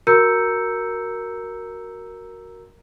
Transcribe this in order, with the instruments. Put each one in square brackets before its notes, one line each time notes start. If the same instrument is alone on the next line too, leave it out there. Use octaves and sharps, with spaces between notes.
[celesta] F#4 A#4 A#5 E6 G6 C#7